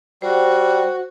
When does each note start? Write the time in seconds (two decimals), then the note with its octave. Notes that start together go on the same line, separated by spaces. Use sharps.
0.22 G3 F#4 C5